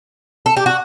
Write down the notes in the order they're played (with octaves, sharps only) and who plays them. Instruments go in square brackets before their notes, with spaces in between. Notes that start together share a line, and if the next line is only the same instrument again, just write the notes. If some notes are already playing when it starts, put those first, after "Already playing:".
[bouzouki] A4
G4
F#4